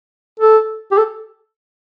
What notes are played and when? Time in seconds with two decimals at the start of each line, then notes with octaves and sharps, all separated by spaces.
0.40 A4
0.92 G4
0.98 A4